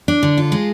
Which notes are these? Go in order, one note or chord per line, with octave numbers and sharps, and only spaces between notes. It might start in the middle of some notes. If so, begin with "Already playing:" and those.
D4
D3
F4
G#3